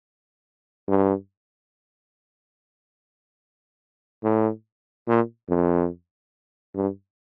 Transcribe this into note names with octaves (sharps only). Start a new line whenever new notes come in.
G2
A2
A#2
F2
G2